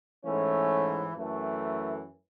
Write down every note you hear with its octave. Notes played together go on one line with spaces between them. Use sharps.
G#2 E3 A3 C#4
F#2 E3 A3